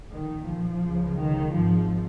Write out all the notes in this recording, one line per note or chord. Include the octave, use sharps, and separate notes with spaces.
A#1 A#2 D#3
F3
C#2 C#3
D#3
G#1 G#2 F3